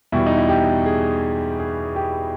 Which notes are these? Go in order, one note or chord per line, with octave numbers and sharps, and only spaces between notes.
E2 B2 G3 E4
D#4
E4
G4
G#4
G#4
G4